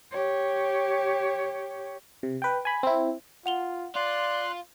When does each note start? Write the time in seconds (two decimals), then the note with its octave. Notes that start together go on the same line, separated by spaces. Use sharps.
0.12 G4 C#5
2.23 C3
2.42 B4 G5
2.65 G#5 B5
2.83 C4 E4
3.46 F4 F#5 F7 G7
3.96 F4 D5 C6 F#6